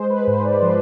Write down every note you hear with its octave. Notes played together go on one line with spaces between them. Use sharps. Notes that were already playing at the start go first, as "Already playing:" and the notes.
Already playing: G#3 C5
B4
G#2 C5
D5
F3 C5